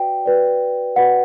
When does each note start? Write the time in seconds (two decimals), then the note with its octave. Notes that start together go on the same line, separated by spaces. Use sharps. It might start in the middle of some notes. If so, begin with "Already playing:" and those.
Already playing: F#4 B4 D5 G5
0.26 F#4 B4 D5
0.96 F#4 B4 D5 F#5